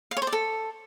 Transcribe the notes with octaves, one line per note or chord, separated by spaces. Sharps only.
F5
C#5
C5
D5
A4